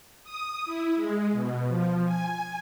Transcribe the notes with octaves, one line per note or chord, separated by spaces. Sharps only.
D#6
E4
G#3
B2
F3
G#5